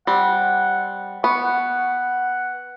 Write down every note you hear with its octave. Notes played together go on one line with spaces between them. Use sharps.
G3 C4 F#5
B3 C#6
F#5